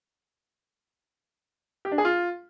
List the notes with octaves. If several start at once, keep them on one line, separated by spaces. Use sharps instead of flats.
G4
D4
G#4
F4